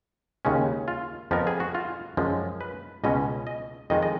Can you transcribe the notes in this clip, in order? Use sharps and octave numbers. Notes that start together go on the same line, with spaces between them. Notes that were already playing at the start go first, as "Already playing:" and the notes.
D#2 C#3 G#3 C#4
F4
F2 F3 B3 A#4
G#4
F#4
F4
F#2 F3 G#3
B4
C#2 B2 G#3 C#4 D#5
D#5
F2 D#3 G#3 D#5
D#5